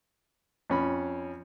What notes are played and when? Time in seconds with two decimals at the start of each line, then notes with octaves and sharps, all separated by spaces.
0.70 F2 C#4 B5